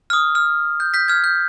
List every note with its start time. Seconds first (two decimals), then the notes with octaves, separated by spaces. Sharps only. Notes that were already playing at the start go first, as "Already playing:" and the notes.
0.10 F6
0.13 D#6
0.35 F6
0.80 G6
0.94 G6 B6
1.08 F6 G#6
1.24 G6